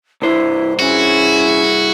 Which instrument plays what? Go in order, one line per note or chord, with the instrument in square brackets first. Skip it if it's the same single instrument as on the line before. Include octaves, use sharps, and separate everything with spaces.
[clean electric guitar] C2 G2 C5 [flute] E4
[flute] C#4 [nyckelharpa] E4 G#4 [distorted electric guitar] F#4